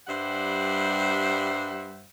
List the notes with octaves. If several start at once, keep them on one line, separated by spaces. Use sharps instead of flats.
G2 G3 C5 E5 F#5